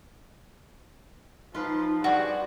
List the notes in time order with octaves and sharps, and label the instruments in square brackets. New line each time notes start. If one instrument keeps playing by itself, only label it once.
[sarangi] F3 [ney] D#4 [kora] F4 B4
[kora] G2 G#4 C5 [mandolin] F#4 [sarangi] D5 [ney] F#5